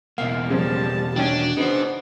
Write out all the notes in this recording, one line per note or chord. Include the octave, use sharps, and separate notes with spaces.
E2 B2 A#3 E5 F5
C#3 F3 G3 A5
D#3 C#4 D4 F#4
C#3 B3 D#4 C5